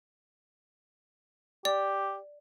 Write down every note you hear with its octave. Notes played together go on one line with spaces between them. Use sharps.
G4 D5